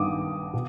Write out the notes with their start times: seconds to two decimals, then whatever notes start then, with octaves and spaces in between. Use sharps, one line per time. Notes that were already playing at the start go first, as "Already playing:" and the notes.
Already playing: G2 D#3 B3 D6 D#6
0.53 B2